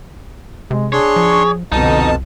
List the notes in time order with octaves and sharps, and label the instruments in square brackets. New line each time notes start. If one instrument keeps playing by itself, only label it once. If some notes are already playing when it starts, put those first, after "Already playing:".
[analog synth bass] C3 [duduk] G#3
[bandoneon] D4 C6 C#6 [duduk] G#4 [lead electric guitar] C#5
[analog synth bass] F3
[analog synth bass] C2 [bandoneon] F2 B2 A5 [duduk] D3 [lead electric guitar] D#4